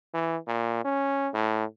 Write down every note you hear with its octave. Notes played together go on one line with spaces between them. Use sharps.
E3
A#2
C#4
A2